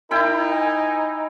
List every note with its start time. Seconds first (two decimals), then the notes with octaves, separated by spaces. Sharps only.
0.11 D#4 E4 A#4 G5 B5
0.51 G#5